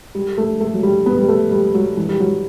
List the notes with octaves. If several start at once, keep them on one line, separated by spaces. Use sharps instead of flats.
G3
A3
A3
F#3
G3
B3
G3
A3
G3
F#3
E3
G3
F#3